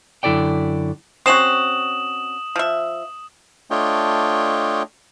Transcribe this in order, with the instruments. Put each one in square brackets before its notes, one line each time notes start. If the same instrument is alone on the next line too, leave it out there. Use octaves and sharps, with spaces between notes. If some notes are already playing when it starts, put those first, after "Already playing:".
[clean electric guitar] F#2 D3 E4 A4 D5 G5
[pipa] C4 C#4 F#4 [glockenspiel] D#6 E7 F#7
[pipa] F3 E5
[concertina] A3 D4 F4 C#5 D#5 G5